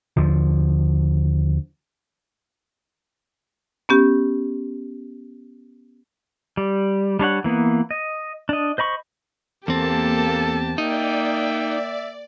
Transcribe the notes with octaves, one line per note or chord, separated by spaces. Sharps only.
D#2 D3 F3
B3 C#4 G4
G3
G3 D4 C#5 F#5
E3 A#3 B3
D#5
D4 D#5
C5 D#5 B5 C#6
E2 A#3 C4 G4 A4 A5
A#3 D#4 D5 E5 G5